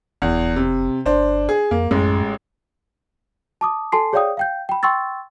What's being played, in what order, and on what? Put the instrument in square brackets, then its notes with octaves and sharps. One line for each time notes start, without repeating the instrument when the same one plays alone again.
[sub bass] F1 [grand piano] E2
[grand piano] C3
[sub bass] G1 [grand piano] D4 C5
[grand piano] G#4
[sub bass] F2 [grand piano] A#3
[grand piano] A1 G#3 [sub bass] F#2
[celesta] A5 D6 D#6
A4 G#5 A5 C6 C7
G#4 C#5 D5 F5 G5 D#6
F5 G5 G6
G5 B5
G5 C6 C#6 E6 A6